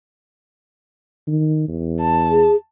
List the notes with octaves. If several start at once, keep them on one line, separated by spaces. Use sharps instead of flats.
D#3
E2
A5
G#4